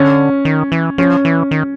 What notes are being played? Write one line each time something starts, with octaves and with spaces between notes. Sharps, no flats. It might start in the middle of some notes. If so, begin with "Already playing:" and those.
Already playing: D3 C#4
D#3
E3
F3 C#4
E3
D#3